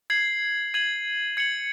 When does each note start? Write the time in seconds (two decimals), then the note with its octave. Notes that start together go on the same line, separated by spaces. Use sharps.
0.10 G#6 C7 F#7
0.74 G#6 D#7 F#7
1.37 G#6 C#7 F#7